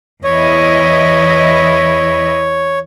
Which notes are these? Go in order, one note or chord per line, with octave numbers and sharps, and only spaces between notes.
E2 E4 C#5 D#5